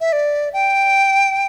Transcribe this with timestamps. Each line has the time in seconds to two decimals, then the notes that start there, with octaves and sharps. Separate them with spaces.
0.01 E5
0.12 D5
0.53 G5